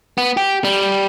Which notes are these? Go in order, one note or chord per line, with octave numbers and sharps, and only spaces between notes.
B3
G4
G3